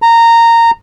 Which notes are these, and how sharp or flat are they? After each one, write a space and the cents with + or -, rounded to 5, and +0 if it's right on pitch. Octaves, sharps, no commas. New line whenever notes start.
A#5 -15